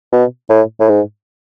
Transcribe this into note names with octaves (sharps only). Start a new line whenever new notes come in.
B2
A2
A2
G#2